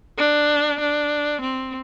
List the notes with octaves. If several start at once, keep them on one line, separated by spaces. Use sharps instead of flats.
D4
D4
C4